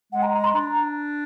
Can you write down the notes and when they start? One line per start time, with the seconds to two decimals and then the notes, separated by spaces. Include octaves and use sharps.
0.12 G#3 F#5
0.22 A#5
0.34 A#5
0.44 C6
0.54 D4 A#5